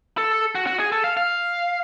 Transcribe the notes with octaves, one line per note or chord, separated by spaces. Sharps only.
A4
F#4
F#4
G#4
A4
F5
F5